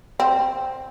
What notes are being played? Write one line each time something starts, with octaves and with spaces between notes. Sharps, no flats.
C4